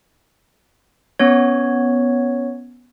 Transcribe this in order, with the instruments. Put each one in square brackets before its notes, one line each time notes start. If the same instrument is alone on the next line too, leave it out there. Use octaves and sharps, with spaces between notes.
[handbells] B3 C#4 C#5